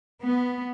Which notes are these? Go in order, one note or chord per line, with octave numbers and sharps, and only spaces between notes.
B3